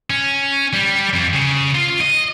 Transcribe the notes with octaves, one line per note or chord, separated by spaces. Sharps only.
C#4
G3
F2
C#3
F4
D#5